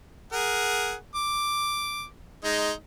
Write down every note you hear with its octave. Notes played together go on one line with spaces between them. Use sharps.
G#4 A#4 F#5
D6
G#3 D#4